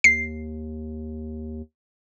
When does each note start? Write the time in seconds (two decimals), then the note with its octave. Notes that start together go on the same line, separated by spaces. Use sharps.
0.04 D#2 C7